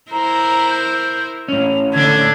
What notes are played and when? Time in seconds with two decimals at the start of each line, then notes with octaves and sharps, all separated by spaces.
0.11 E4 A#4 C5 A#5
0.71 G6
1.48 A2 C#4 F7
1.94 D3 A3 D4 G#6